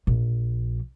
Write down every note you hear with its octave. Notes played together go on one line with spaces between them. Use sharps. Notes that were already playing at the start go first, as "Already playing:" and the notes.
A#1